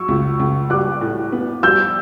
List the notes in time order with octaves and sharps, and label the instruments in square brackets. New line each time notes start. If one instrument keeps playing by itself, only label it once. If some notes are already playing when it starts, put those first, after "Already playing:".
Already playing: [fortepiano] F#3 [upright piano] C#6 E6
[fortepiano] C#2
C#2
[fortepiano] G3 [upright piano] D6 F#6
[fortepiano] A2
B3
[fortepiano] G3 [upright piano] E6 G6